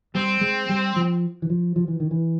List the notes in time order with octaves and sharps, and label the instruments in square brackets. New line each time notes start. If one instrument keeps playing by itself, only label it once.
[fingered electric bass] G3 [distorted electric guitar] C4
[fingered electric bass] G#3
G3
F3
E3
F3
F3
E3
D#3
E3